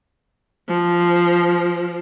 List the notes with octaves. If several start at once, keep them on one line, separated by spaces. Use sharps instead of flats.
F3